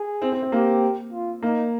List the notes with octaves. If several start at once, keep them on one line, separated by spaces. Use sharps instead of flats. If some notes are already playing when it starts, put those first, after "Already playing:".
Already playing: G#4
C4
C4
C4
A#3 G4
F4
A#3 D#4